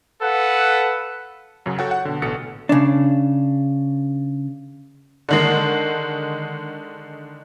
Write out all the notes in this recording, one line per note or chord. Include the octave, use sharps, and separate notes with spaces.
A4 B4 F5 F#5
F#2 C#3 F#3
F#4 A4 C#5 F#5 G5
F#5
B2 D3
A1 B2 A4 C#7
C#3 D4
D3 D#3 G#3